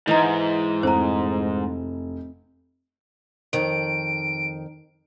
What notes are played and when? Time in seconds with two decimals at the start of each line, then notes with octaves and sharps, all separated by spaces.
0.08 G#2 E3 A4 D#5 A#5
0.83 F1 C5 A#5
3.53 F2 D#3 D7